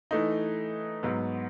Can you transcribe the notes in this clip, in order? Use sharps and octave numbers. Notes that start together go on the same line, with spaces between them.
E3 A3 D#4
G#2 F#3 B3